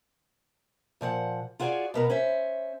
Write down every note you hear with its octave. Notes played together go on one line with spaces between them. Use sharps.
A#2 F3 D5 F#5
F4 F#4 G#4 C#5 D5
B2 B3 A#4
C#4 C5 E5